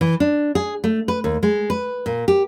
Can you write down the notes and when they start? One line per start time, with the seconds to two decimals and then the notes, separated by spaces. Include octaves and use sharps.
0.01 E3
0.20 D4
0.55 G#4
0.84 A3
1.08 B4
1.24 D#2
1.43 G#3
1.70 B4
2.06 A#2
2.28 G4